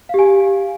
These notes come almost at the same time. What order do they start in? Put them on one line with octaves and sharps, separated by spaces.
F5 G4 G#5